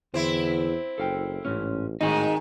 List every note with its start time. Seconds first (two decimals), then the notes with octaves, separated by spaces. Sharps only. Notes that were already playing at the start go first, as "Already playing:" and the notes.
0.14 E2 D3 C4 E4
0.98 F#1 A4 F5 G5
1.45 A1 G#2 C#4
2.01 G#1 A2 D#3 D#4 G#4 D#5